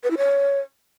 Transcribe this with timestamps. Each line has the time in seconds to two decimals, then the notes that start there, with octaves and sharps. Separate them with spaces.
0.03 B4
0.10 E4
0.17 C#5